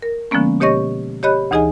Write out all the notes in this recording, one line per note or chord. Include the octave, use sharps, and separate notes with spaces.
A#4
D3 F3 G#3 A#3 B3 C#4
B2 G4 C#5 D#5 C#6 A#6
G4 C#5 D#5 B5 F#6
D2 E3 D#4 G#4 D#5 G#5